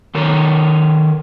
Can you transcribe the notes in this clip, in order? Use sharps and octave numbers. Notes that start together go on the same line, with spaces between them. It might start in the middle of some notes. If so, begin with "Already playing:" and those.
D#3 A4 A#4 C#5